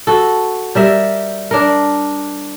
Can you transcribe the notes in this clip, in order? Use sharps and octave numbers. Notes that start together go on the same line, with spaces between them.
F#4 A4
G3 A#4 E5
D4 A#4